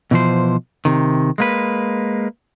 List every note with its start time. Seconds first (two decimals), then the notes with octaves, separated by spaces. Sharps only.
0.11 B2 E3 F3 C5
0.85 C3 D#3
1.38 G#3 A#3 B4